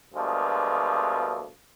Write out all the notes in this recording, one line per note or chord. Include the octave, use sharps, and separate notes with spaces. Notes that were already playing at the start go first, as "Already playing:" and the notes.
D2 G2 B2 F3 G#3 A#3